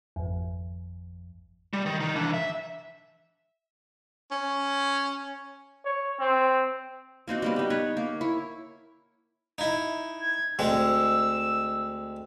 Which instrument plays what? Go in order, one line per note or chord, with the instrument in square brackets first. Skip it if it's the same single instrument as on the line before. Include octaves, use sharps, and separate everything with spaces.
[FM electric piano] G#1 F2
[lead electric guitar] G3
D#3
D#3 D#4
E3 D4
E5
[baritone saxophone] C#4
[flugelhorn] C#5
C4
[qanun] A#3 C4 D#4 F#4
G3 A#3 B3
B3 D#4
B4 C#5 F#5
A#3
E4 C#5
[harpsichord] D#4 E4
[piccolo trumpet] G#6
[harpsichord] D2 G#3 C4 [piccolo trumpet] E6